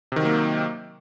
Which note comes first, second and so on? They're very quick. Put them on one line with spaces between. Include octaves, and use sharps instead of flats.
C3 D#3 F#3 A#3